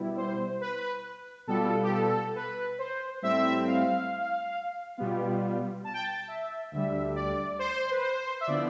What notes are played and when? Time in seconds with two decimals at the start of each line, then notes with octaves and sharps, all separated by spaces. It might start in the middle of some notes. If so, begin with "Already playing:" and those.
Already playing: B2 G3 B3 E4
0.17 C5
0.61 B4
1.47 B2 G3 B3 F4 A4
1.83 G4
1.92 A4
2.36 B4
2.79 C5
3.22 A2 G3 C4 E4 E5
3.67 F5
4.97 B2 G3 B3 F4
5.84 A5
5.94 G5
6.03 A5
6.28 E5
6.72 D2 D3 G3 E5
7.16 D5
7.59 C5
7.91 B4
8.02 C5
8.41 E5
8.46 D3 F3 B3 E4 D5